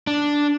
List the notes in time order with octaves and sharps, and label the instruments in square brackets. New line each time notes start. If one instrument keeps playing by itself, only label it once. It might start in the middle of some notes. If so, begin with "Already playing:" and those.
[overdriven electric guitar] D4